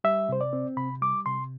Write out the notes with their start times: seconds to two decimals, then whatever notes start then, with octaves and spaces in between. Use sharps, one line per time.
0.04 G3 E5
0.29 C3 C5
0.41 D5
0.53 C4
0.77 C3 B5
1.02 G3 D6
1.26 C3 C6